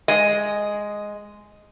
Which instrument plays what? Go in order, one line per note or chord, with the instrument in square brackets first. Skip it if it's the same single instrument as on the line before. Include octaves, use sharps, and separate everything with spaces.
[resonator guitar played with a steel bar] G#3 D#5